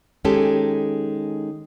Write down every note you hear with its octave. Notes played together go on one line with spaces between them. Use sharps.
D#3 G#3 C#4 G4 A4